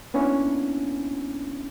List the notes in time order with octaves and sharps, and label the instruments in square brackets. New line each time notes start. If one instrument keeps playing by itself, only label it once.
[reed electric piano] A#3 B3 C#4 D4 E4